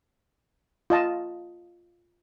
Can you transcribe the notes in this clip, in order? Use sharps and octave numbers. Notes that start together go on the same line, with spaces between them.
F4 D#5 A5